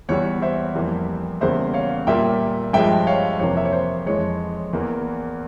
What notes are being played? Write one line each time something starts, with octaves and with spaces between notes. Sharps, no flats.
E2 E3 G3 C#5
C5 E5
F2 E3 G3 A#3
E2 C#3 G3 A#3 C5 E5
C#5 F5
A#2 G3 A#3 E5 G5
G2 F3 G#3 E5 G5
C#5 F5
F2 C3 E3 A#3 C#5
E5
C#5
C5
F2 E3 G#3 C#5
E2 E3 A#3